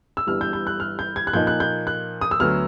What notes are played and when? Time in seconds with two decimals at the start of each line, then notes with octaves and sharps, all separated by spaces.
0.17 E6
0.27 G1 G2 E3 G3 F6
0.41 G6
0.53 G6
0.67 F#6
0.80 F6
0.99 G6
1.16 G#6
1.27 F#6
1.33 A#2 F3 A#3 D#4 G6
1.47 F#6
1.60 G6
1.87 F#6
2.21 D#6
2.31 E6
2.40 D2 D3 F#3 B3 F6